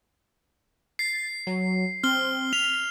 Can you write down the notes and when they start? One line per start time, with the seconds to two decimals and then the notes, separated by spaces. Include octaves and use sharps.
0.99 A6 C7
1.47 F#3
2.04 C4 F6 G7
2.53 B6 F7